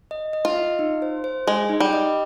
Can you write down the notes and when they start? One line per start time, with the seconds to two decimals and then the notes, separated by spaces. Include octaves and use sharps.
0.11 D#5
0.33 D#5
0.45 F4
0.56 D#5
0.79 D#4
1.02 C5
1.24 C5
1.47 G#3 G#4
1.69 D#4
1.80 G3
1.93 D#5